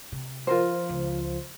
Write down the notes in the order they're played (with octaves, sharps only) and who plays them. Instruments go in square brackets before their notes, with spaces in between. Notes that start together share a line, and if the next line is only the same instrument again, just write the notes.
[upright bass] C3
[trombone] F3 [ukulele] F4 A#4 C5
[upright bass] C#2